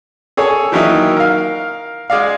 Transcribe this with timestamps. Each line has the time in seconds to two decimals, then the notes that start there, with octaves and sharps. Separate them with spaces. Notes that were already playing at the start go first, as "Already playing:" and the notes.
0.37 G#4 A4 C#5 G#5
0.72 D#3 E3 F#3 A#3 D#4 E5
1.17 A#4 F5
2.10 G#3 D5 F5